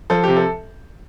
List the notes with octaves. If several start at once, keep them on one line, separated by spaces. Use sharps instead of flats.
F3 A4
C3 G4
A4